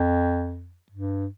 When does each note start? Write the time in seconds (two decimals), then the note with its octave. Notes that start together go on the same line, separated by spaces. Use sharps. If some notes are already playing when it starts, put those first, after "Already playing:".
Already playing: F2
0.92 G2